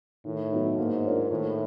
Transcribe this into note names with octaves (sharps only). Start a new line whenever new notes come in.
A2 D#3
F#3 B3 D#4
G#2 A#3
D4 F4 A#4 C#5
A2 D#3